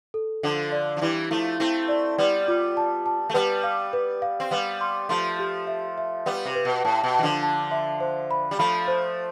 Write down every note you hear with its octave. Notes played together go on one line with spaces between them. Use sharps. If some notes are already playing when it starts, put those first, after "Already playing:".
A4
D3 F3 A4
D5
F3
E3 G3 E4
F3 A3 E4
A3 C4 E4
D5
G3 B3 D5
F4
A5
A5
A3
G3 B3 B4
F5
B4
F5
C4
G3 B3 F5
C6
F3 A3 C6
G4
E5
E5
G3 B3 B4
C3
B4
B2
A2 A5
B2
E3 A5
D3 F3
A5
E5
C5
B5
G3
F3 A3 B5
C5